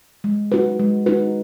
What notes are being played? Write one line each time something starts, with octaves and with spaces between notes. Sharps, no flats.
G#3
D#4 F#4 B4
G#3
D#4 F#4 B4